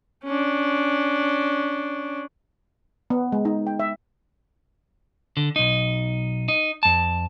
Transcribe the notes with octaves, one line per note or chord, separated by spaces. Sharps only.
C#4 D4
B3
G#3
D#4
G5
E5
D3
B1 D#4
D#4
F2 A5